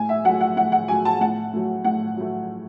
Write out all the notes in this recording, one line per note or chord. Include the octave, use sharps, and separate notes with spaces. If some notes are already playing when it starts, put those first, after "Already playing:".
Already playing: A2 G#5
E5
F#3 A3 F#5
F#5
A2 F#5
F#5
F#3 A3 G#5
A5
A2 F#5
F#3 A3
A2 F#5
F#3 A3